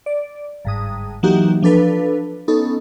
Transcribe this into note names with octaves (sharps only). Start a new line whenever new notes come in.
D5
G1 G#2 D#6
E3 F#3 A#3 D#4 F#4 G4
F3 D4 A4 B4
B3 C#4 D#4 A4